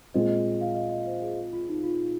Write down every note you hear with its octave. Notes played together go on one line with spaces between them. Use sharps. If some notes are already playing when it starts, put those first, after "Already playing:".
A#2 G#3 C4 D#5
D#5
F5
D#5
D#5
C5
G#4
F4
D#4
F4